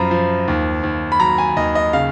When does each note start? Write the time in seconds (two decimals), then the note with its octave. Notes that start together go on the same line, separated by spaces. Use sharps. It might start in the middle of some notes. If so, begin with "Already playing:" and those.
Already playing: F#2 F3 A#5 B5
0.11 F3
0.48 D#2
0.83 D#2
1.12 B5
1.20 F#3 A#5
1.38 G#5
1.57 D#2 D#5
1.75 D#5
1.93 C#3 F5